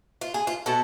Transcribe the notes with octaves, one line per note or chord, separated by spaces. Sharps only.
F4
G#4
F4
B2 B3 A4